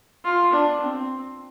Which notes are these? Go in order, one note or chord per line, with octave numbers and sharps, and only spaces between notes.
F4
D4
C4